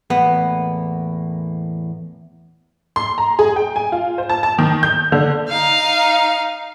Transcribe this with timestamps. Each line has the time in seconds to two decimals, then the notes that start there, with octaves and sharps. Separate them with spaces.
0.10 E2 A2 A#3 B3
2.96 C6
3.18 A#5
3.39 G#4
3.56 G5
3.76 G#5
3.92 F4
4.18 C5
4.30 A5
4.43 A5
4.59 D#3
4.83 G6
5.12 D3
5.49 D#4 F5